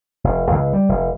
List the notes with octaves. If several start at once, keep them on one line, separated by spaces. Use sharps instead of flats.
F1
C#2
G3
F1